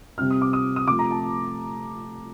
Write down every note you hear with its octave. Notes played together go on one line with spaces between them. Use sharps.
C3 G3 C4 F6
D#6
D6
D#6
D#6
C3 F3 A3 D6
A#5
A5